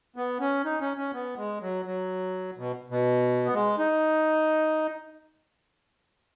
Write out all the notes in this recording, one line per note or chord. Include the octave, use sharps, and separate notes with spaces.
B3
C#4
D#4
C#4
C#4
B3
G#3
F#3
F#3
B2
B2
B3
G#3
D#4